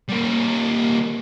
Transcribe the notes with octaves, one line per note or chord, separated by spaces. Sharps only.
G3 A#3